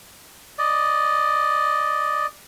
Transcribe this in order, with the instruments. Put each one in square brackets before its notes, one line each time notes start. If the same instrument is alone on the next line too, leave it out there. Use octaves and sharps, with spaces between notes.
[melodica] D5 D#5